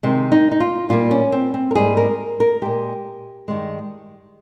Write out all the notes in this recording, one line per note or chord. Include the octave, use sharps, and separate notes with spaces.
C3 D#3 G#3
D#4
D#4
F4
A#2 G3 A#3 F4
C#4
C4
C4
A#4
G#2 G3 A#3 G#4
A#4
A#4
A#2 G#3 G4
G2 D#3 G#3